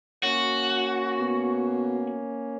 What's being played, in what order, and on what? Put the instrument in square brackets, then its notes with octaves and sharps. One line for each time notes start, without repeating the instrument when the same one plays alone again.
[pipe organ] A#3 C#4 [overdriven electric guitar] F#4
[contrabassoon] B2